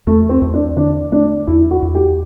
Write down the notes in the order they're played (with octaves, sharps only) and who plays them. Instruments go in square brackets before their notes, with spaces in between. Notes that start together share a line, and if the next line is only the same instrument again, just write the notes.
[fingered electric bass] E2 [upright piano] A3
[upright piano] C4
[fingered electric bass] E2
[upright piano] D4
[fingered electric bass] D3 [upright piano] D4
[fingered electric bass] A3 [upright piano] D4
[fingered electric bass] E2 [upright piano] E4
[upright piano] F#4
[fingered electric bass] E2
[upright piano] G4